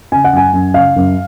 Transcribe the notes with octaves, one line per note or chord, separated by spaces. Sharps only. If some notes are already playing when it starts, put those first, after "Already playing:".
C#3 G#5
F#5
F#2 G#5
F#2
C#3 F5
F#2